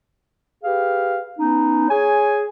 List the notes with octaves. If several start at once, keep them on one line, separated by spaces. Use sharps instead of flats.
G4 G#4 B4 F5
B3 C#4 D#4
G#4 C#5 G#5